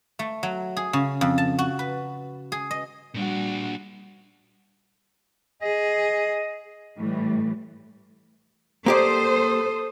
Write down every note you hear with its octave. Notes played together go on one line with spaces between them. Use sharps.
A3
F#3
G#4
C#3
F2
A5
F#4
B4
G#4
D#5
A#2 G3 D4 F#4
G#4 D#5
A2 E3 G3 A3
A#3 G4 A4 C5 D5 D#6